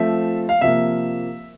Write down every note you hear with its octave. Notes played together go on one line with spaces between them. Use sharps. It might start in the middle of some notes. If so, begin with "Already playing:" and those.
Already playing: F3 A3 C4 E5
F5
C3 F3 A#3 E5